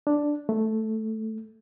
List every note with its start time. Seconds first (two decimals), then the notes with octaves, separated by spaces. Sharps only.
0.07 D4
0.49 A3